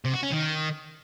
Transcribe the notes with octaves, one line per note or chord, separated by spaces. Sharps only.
C3
F#4
C#4
D#3